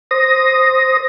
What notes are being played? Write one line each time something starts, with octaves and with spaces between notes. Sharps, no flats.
C5 D#6 A#6